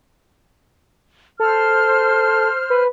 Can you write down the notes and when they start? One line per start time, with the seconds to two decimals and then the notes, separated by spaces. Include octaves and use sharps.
1.40 A4 C5 F6
2.70 B4